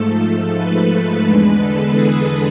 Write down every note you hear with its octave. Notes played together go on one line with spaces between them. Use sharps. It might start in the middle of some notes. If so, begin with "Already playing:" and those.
Already playing: G#2 F3 A3 A4
A4
B4
A4
E2 D3 G#3 B4
A4
G#4